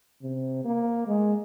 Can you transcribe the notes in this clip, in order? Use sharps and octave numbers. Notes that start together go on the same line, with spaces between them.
C3
A#3
G#3